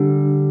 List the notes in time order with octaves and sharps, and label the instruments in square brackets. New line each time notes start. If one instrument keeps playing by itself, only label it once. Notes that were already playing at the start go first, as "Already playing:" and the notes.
Already playing: [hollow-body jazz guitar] D3 G3